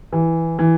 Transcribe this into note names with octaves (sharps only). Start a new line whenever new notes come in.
E3
E3